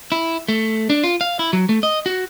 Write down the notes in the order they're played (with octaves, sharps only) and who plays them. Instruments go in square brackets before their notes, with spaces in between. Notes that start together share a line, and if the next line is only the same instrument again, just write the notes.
[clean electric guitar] E4
A3
D4
F4
F5
E4
F#3
A3
D#5
F#4